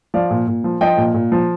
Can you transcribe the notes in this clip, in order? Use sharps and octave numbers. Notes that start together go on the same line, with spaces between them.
F3 D5 F5
A#2
A#2
F3
F3 D#5 G5
A#2
A#2
F3